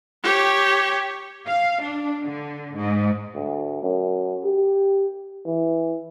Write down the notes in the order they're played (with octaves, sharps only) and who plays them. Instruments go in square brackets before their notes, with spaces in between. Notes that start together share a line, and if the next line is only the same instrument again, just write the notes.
[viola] G4 C#5
[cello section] F5
D4
D3
G#2
[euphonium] D2
F#2
G4
E3